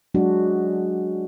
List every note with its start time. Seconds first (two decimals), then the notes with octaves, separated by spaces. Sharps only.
0.14 F#3 G#3 D4 F#4